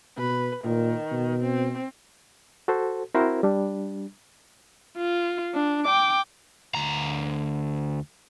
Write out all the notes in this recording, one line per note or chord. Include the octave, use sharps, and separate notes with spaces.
B2 B4
A#2 D#3
B2
C4
F#4 A4 C5
C4 E4 F#4 A#4 C5
G3 D4
F4
D4
G5 D6
D2 A#5